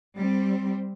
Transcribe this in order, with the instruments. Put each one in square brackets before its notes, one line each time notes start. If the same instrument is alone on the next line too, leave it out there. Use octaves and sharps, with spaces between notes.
[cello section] G3 C4